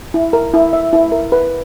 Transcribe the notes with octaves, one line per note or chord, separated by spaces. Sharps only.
E4
A#4
E4
E5
E4
A#4
B4